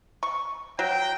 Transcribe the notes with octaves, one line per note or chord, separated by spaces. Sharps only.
C#6
F#3 G5